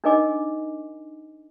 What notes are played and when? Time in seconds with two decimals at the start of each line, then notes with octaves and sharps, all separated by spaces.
0.04 D4 D#4 A#4 D#5 G#5 D6